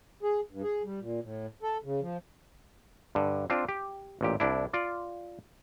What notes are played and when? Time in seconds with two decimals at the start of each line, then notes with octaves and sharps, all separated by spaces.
0.23 G#4
0.51 G2
0.63 G#4
0.84 G3
1.00 A#2
1.22 A2
1.63 A4
1.84 C#3
2.01 F3
3.15 G2 D3
3.50 C4 D4 F4
3.69 G4
4.21 A1 A#2 G4
4.40 C2 D4 E4
4.73 F4 D5